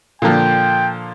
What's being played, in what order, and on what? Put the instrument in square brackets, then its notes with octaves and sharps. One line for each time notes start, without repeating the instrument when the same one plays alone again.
[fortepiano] A#2 D3 F3 [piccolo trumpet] G5